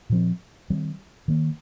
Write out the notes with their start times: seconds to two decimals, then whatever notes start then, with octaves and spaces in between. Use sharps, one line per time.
0.10 A#2 F3 C4
0.70 D#3 G3 C4
1.28 D#3 A#3